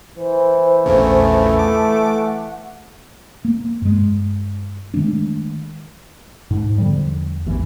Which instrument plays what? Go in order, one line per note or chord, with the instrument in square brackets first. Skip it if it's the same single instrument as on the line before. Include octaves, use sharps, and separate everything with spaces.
[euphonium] E3 [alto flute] C5
[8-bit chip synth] A#1 E2 C#3 [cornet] A3
[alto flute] F#5 [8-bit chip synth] D6
[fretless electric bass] A#3
G2 G#3
D#3 G#3 A3 D4
G#2
E2 D3 F3 G3
A1 E2 G#2 E3